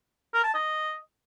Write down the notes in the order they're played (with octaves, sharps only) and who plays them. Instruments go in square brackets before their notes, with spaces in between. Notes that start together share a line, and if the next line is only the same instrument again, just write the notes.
[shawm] A#4
A5
D#5